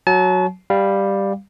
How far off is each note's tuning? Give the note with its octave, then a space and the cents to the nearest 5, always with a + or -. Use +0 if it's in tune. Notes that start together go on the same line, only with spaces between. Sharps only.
F#3 -5 A5 -40
G3 +5 F5 +0